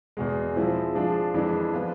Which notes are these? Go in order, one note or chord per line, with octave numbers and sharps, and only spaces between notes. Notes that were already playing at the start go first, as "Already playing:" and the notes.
E2 B2 G#3
F3 G#3 C4 E4
F3 G#3 D4 F4 G#4
F2 E3 G#3 D4
F3 B3 F4